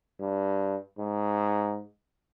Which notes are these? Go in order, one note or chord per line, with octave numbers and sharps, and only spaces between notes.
G2
G#2